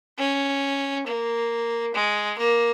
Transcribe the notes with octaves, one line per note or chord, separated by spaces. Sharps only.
C#4
A#3
G#3
A#3